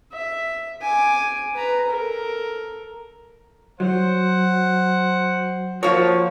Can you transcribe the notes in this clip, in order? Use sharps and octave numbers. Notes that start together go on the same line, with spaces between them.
E5
G#5 D6
B4 A#5
A4 A#4
F#3 C5 F#5
F3 A#3 F#4 C#5